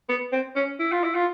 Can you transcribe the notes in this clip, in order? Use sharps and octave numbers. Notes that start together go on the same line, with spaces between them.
B3
C4
C#4
E4
F4
E4
F4